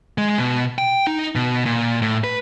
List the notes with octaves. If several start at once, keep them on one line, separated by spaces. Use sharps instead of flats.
G#3
B2
G5
D#4
B2
A#2
A2
B4